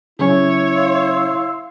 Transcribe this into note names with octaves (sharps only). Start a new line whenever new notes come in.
C#3 F#3 C#4 E4 C#5
F5 C6 E6